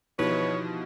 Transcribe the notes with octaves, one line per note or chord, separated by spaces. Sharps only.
B2 F3 D#4 E4 G4 B4 C#5